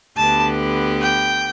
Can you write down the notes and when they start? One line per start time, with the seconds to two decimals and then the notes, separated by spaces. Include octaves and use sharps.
0.17 D2 D3 B3 G4 B4 A5
1.01 G5